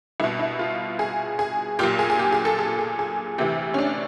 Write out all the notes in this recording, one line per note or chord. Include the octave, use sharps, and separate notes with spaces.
C2 B2 E4
E4
F4
G#4
G#4
B1 A#2 G4
G#4
G#4
G4
G#4
A4
G#4
G#4
G#4
D2 C3 E3 G4
C#4
D4